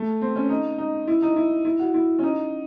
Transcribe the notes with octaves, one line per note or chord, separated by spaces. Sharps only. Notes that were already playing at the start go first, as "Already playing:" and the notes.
Already playing: A3
C4
C#4
D#4
D#4
E4
D#4
E4
E4
F#4
E4
C#4
D#4